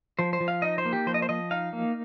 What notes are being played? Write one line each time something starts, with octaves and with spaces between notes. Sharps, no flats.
F3 C5
C5
F3
F5
D#4 D#5
C5
A#3
G4
F3 C5
D#5
C5
F3 D#5
D#4 F5
A#3